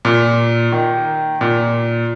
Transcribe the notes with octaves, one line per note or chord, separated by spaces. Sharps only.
A#2
D#3
A#2